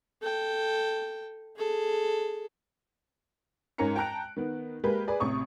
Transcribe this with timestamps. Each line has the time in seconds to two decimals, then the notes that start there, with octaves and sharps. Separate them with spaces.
0.22 A4 G5
1.57 G#4 A4
3.78 G#2 C#4 A#4 A#5 C#7
3.96 G5 A5 A#5 F#6 D7
4.37 D#3 B3
4.84 G#3 A#3 G4 A#4 B4
5.08 G#4 B4 D5
5.20 A1 C3 C#6 D#6